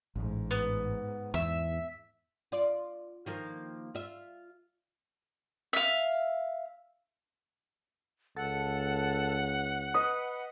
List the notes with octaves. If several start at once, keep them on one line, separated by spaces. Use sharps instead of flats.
A1 G#2
B3
E2 E5
F4 D5
D#3 F3 A#3
F4 E5
E5 F5
C#2 A4 F#5
B4 D#5